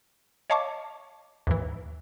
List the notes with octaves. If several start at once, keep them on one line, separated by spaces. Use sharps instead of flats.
C#5 D#5 F5 A5 C#6 D6
D#2 G#2 E3